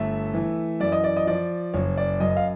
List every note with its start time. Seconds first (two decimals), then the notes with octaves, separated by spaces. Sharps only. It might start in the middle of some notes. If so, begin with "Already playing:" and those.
Already playing: G1 A3 E5
0.34 E3
0.80 F#2 D5
0.92 D#5
1.04 D5
1.17 D#5
1.27 F3 D5
1.74 F#1 C#5
1.97 D5
2.20 F#2 D#5
2.37 F5